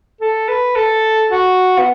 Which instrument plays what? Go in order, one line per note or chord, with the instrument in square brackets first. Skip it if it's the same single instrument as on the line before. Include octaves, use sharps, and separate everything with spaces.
[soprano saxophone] A4
B4
A4
F#4
B3